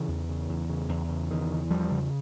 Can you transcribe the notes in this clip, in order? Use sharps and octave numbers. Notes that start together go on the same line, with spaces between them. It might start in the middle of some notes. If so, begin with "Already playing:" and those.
Already playing: C#3 E3
E2
C#3
E2
C#3
E2
C#3
E2 D#3
C#3
E2 F3 G3
C#3